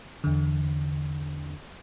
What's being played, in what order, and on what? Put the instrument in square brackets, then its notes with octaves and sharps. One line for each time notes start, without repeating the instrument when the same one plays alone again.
[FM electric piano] E2 D3